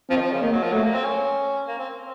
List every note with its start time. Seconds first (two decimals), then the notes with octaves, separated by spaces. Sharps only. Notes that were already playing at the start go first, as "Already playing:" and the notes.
0.10 F3 C4
0.16 D#3
0.20 F3
0.31 C#3
0.42 D#3 A#3
0.52 F#3
0.63 F3
0.72 F#3 A3
0.84 A#3
0.94 C4
1.05 C#4
1.67 A#3
1.78 C4
1.99 C4